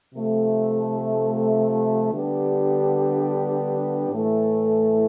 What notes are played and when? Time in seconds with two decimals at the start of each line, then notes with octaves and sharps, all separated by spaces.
0.13 C3 F3 A3
2.11 D3 G3 B3 D4 G4
4.10 A2 E3 A3